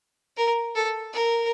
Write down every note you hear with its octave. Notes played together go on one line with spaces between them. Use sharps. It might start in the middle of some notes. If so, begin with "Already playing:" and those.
A#4
A4
A#4